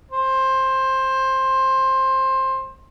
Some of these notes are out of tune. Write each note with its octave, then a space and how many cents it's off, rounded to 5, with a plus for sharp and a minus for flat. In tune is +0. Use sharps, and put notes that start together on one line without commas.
C5 +15